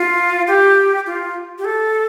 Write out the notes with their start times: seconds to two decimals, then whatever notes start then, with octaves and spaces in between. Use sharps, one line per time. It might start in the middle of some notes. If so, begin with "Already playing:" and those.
Already playing: F4
0.47 G4
1.06 F4
1.58 G4
1.64 A4